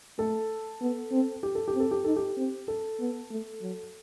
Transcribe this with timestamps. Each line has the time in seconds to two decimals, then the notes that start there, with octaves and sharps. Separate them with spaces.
0.18 A3 A4
0.81 B3
1.12 C4
1.43 G4
1.55 A4
1.68 G4
1.75 C4
1.80 A4
1.91 G4
2.04 D#4 A4
2.16 G4
2.37 C4
2.68 A4
3.00 B3
3.30 A3
3.61 F#3